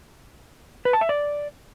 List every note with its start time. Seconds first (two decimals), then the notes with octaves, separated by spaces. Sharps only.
0.85 B4
0.93 A5
1.01 E5
1.09 D5